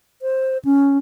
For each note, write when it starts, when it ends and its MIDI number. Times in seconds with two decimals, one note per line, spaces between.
0.22 0.58 72
0.65 0.98 61